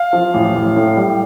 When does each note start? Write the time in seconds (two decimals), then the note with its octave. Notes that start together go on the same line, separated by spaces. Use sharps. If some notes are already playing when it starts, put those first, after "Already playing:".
Already playing: F5
0.13 F3
0.34 A1
0.55 A1
0.76 A2
0.97 G3